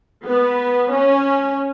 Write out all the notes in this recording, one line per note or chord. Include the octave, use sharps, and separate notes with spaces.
B3
C#4